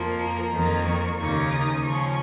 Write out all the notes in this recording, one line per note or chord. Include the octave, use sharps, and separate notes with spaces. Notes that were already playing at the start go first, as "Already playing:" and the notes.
Already playing: F2 F3 A#3
A#5
F2 D#3 A#3
C#6
D#2 C#3 A#3 D#4 C#6
D#6
C#3 F3 C#4 C#6